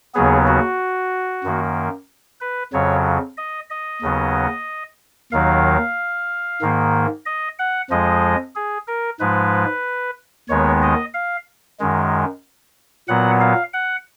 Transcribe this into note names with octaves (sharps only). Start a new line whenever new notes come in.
D#2 C#3 F#3 B3 G#4
F#4
F#2 D#3 A#3
B4
F2 C#3 F#3 C#5
D#5
D#5
D#2 C#3 F#3 B3
D#2 D#3 F#3 F5
G#2 D#3 A#3
D#5
F#5
F2 F3 G#3 D#5
G#4
A#4
G#2 F3 G#3 B4
D#2 D#3 G#3 B3 C#5
D#5
F5
F#2 D#3 G#3
A#2 F#3 B3 F#5
F5
F#5